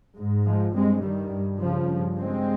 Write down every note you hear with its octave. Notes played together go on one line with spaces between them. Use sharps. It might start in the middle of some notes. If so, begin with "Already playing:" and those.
G#2
F3 G#3
G2 G#3 C4
D#3 G3
G2
C#3 F3
G2
G#3 C4